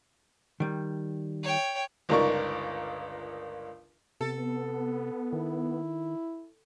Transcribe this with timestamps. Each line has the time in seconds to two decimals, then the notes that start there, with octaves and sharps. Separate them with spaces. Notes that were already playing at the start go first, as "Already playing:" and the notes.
0.60 D#3 G3
1.43 C#5 G5
2.09 G1 C#2 D#4 A#4 D5 C#6
4.21 C3 B3 A4
5.33 D#3 E4